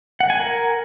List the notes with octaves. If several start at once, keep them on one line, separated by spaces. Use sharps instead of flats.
F#5
G#5
A#4